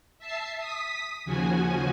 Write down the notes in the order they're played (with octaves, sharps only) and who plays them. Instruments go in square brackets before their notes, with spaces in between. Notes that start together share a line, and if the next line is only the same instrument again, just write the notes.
[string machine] E5 A5 C7
D#6 B6
D#2 C#3 F3 F#4 G#5